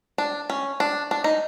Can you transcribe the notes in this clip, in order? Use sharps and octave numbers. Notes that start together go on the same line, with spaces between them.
D4
C#4
D4
D4
D#4